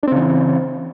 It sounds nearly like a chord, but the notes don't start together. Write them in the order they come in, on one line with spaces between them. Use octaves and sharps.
D4 C4 C#3 E3